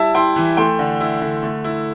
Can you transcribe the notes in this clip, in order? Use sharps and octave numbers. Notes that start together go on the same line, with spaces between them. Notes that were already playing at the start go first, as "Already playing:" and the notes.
Already playing: G3 E4 E5 A5
E4 G5 C6
E3
A3 G5 C6
D3
E4
D3
A3
E4